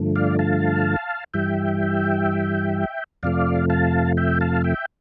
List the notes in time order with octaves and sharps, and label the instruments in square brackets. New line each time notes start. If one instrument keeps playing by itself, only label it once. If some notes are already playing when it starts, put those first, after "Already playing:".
Already playing: [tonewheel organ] G2 D3 F3 A3
D5 F5
F5 A5
G2 E3 G3 E5 G5
F2 C3 F3 A3 D5 F5
F5 A5
E5 G5
F5 A5
E5 G5